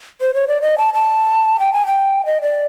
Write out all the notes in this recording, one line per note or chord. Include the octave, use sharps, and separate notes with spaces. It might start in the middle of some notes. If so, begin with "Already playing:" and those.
C5
C#5
D5
D#5
A5
A5
G5
G#5
G5
D#5
D5